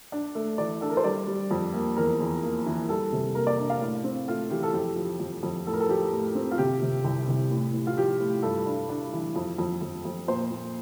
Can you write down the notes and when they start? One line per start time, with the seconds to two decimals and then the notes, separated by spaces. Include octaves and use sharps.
0.12 D4
0.35 A3
0.58 E3 D5
0.81 D4 A4
0.89 A#4
0.97 C5
1.04 G3 D5
1.27 G3
1.51 F2
1.74 A#3
1.97 E2 A#4
2.20 E2
2.43 A#3
2.66 E3
2.89 G3 A4
3.13 C3
3.35 A#3 A#4
3.47 D5
3.58 D4
3.70 F5
3.81 A2
4.04 C4
4.27 A3 F4
4.50 E3 G4
4.63 A4
4.73 F2 G4
4.96 F3
5.20 F2
5.43 F2
5.67 A2 A4
5.73 A#4
5.80 A4
5.89 F3 G4
6.12 A2
6.35 C4
6.51 F4
6.58 C3 G4
6.82 C3
7.04 C2
7.28 C2
7.51 A2
7.74 A2
7.87 F4
7.97 F3 G4
8.20 A2
8.42 G2 A4
8.66 D4
8.89 D4
9.13 E3
9.36 F2
9.58 F2
9.82 F2
10.05 F2
10.27 A#2 C5
10.51 A#2